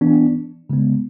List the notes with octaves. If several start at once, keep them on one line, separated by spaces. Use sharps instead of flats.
E3 B3 D4
C#3 G#3 B3